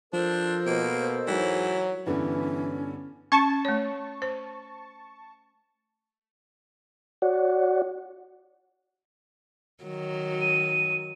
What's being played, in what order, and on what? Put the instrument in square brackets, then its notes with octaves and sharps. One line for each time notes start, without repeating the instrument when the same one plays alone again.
[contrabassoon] F3 [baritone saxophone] D4 [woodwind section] A4 A#4 C5
[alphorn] B2 [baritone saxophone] A#3
[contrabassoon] G#2 [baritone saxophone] E3 [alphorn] F#3
[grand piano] G2 D3 B3 [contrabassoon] E3 [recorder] C#4
[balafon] C#4 [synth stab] A5 C#6
[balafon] A3 C#5
C5
[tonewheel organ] F#4 C#5 D5 F#5
[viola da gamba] D#3 F#3
[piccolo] D#7